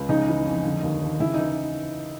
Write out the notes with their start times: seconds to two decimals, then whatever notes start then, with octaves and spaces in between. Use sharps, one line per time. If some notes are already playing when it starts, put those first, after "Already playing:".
Already playing: C#2
0.09 C#3 D#4
0.28 E3
0.46 F2
0.64 D3
0.83 D#2
1.02 D#2
1.20 C#3 E4
1.34 E3 D#4